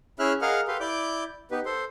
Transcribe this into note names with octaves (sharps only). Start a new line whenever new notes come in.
C#4 E4 G#4 E5 F6 F#6
G#4 A#4 D#5 F5 F#5 F6
G4 A4 B4 F5 C6
E4 D5 D6 G6
B3 D#4 G4 B4
A4 C5 C6